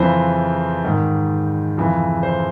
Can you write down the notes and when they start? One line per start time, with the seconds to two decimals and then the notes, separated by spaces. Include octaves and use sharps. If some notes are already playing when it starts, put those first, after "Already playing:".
Already playing: F2 C#3 E3 C5
0.85 G#2 D#3
1.77 F2 C#3 E3
2.23 C5